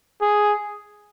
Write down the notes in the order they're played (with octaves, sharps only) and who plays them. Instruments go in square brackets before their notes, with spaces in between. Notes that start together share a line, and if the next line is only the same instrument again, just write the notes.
[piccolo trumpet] G#4